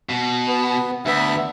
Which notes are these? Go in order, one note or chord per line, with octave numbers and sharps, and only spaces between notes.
B2
B3
D2 B3 E5